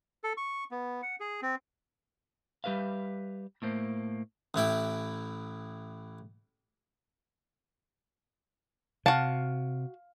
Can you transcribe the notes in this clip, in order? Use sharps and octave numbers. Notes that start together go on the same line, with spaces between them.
A4
C#6
B3
F#5
G#4
C4
G3 G4 B4 E5 F5
A2 A3 A#3 C5
A1 E3 E4 G5
C3 F#4 F5 A5